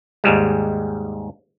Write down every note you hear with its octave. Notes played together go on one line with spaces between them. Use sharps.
D#2 G#2 G3 G#3